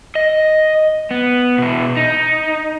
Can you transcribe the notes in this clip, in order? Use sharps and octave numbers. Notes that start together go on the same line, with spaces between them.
D#5
B3
B2 E4
D#4